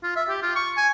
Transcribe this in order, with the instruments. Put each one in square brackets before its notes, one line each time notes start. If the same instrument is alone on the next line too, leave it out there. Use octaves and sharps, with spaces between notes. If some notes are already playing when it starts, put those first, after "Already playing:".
[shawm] F4
E5
G4
F4
C#6
G#5